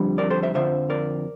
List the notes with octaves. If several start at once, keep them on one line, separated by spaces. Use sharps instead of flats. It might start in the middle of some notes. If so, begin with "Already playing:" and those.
Already playing: F2 D3 G3
A#4 D5
A4 C5
C5 E5
F2 D3 F3 C5 E5
A#4 D5